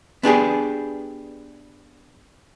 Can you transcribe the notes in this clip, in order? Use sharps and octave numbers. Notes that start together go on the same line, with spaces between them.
B3 D4 G4 G#4